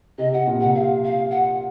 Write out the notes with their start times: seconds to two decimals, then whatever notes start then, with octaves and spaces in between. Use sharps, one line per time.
0.18 C3 D#5
0.33 C3 F#5
0.47 A#2
0.60 C3 F#5
0.74 C3 F5
1.03 F5
1.30 F#5